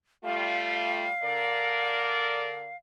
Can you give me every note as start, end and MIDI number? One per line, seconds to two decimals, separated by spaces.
0.24 1.07 55
0.24 1.07 57
0.24 1.07 65
0.24 2.76 77
1.24 2.69 50
1.24 2.69 70
1.24 2.69 74